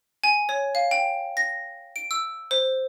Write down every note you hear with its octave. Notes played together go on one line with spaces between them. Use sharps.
G#5
C#5
F5
G5
A#6
D7
E6
C5